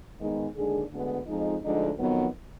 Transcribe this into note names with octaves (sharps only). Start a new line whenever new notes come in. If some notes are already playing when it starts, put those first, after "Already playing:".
G#2 D#3 G#3 B3 D#4
D#2 D3 G#3 D4 G#4
D2 D3 G#3 B3
F2 F3 G#3 D#4
D2 D3 F3 G#3 D#4
F2 D#3 F#3 B3